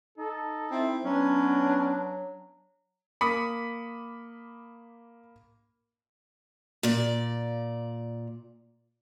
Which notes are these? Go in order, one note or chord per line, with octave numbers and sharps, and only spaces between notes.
D#4 A4
C4 E4
F#3 B3 C#4 D4
A#3 B5 D6 D#6 B6 C#7
A#2 D5